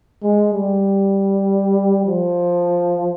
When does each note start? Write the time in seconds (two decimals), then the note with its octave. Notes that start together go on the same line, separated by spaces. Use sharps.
0.23 G#3
0.53 G3
2.05 F3